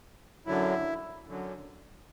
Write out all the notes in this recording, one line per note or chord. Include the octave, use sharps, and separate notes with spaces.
F#2 D3 F#3 E4
F#2 D3 F#3